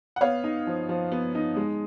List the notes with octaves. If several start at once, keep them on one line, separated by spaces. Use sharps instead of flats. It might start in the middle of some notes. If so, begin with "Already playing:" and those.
F#5
B3 C#5 F5
D#4
F3
F3
B3
D#4
G#3